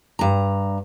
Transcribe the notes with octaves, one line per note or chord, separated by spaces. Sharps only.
G2 A#5